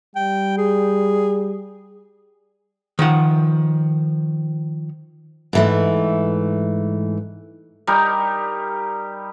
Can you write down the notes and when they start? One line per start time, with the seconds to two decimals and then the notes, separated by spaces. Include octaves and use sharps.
0.16 G3 G5
0.58 G#4
2.99 D#3 F3 F#5
5.53 G#2 E3 A3
7.87 G3 D#4 A#4